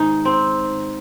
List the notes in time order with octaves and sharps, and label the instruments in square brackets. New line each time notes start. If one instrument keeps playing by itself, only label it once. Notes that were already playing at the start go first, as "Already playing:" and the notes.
Already playing: [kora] G#2 D#3 D#4 G#4
C4